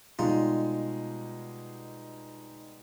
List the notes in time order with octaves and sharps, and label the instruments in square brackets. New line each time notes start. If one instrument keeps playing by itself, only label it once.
[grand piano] B2 G3 G#3 [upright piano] D#4 [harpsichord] F4